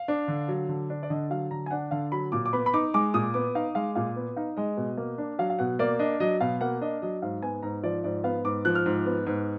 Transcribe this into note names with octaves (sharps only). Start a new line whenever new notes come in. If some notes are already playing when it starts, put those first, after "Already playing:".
Already playing: F5
D4
D3
F#3
D3
D4
D5
D3 D#5
F#3 F5
D3 A#5
G#5
D4 F#5
D3 F5
F#3 B5
A#2 D6
D6
B3 B5
B5
D#4 D6
G#3 D6
A#2 D#6
B3 D6
D#4 F5
G#3 F5
A#2 F5
B3
D#4 F5
G#3 D#5
B2
A#3
D4
F#3 F5
F5
B2 F#5
A#3 D5
D4 D#5
F#3 D#5
B2 F5
A#3 F#5
D4 D#5
F#3 D#5
G#2 F5
B3 G#5
G#2 A#5
F3 D5
G#2 D5
B3 F5
G#2 D6
F3 F#6
F6
G#2
B3
G#2